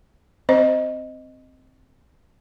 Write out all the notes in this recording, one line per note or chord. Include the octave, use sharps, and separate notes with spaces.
C4 C5 D#5